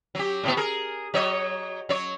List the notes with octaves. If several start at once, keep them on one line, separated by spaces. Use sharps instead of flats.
F#3 G4
A2 D3 B3
G#4 A#4
F#3 C#5 D#5
F#3 C#5